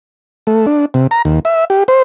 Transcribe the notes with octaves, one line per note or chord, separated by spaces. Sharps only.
A3
D4
C3
A#5
D#2
E5
G4
C5